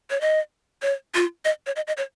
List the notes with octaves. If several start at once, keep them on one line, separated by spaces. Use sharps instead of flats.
C#5
D#5
C#5
F4
D#5
C#5
D#5
D#5
C#5